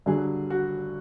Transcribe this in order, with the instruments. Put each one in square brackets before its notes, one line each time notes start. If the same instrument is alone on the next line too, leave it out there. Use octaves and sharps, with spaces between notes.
[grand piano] G2 D3 F#3 G#4
F#4